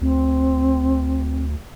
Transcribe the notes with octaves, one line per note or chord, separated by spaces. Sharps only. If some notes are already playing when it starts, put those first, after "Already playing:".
D2 C4